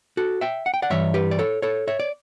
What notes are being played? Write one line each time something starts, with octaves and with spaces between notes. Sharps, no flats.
F#4 A4
E5 G5
F#5
G5
D5 F#5
G2 E3 C#5 E5
G4 B4
D5
A4 C#5
A4 C#5
C#5 E5
D5